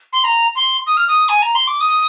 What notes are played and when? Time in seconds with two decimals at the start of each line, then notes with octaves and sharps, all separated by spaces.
0.13 C6
0.24 A#5
0.56 C6
0.87 D#6
0.97 F6
1.08 D#6
1.29 G#5
1.42 A#5
1.55 C6
1.67 D6
1.81 D#6